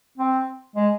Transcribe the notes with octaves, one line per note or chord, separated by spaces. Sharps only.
C4
G#3